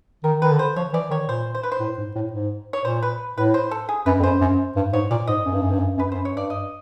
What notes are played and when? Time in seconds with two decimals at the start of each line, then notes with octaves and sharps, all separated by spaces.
0.24 D#3 A#4
0.42 D#3 B4
0.51 D3
0.59 C5
0.76 F3 C#5
0.93 E3 D5
1.11 D#3 C#5
1.28 A#2 C5
1.55 C5
1.63 B4
1.72 C5
1.80 A2
1.98 G#2
2.15 A2
2.33 G#2
2.73 C#5
2.85 A#2 C5
3.03 B4
3.37 A2 B4
3.54 C5
3.71 A4
3.89 G#4
4.06 F#2 B4
4.20 F2
4.24 F#2 C5
4.41 F#2
4.76 G2
4.93 G#2 C#5
5.11 A#2 D5
5.27 G#2 D#5
5.46 F#2
5.53 G2
5.62 F#2
5.71 G2
5.79 F#2
5.97 F#2 B4
6.12 F#2 C5
6.25 C#5
6.32 G2 D5
6.50 D#5